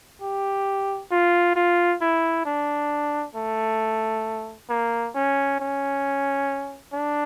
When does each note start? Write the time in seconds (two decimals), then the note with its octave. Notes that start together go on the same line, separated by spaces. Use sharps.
0.22 G4
1.11 F4
1.56 F4
2.01 E4
2.45 D4
3.35 A3
4.69 A#3
5.15 C#4
5.60 C#4
6.93 D4